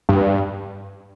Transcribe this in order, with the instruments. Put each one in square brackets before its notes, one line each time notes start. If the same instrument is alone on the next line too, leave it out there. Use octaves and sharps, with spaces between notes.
[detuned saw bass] G2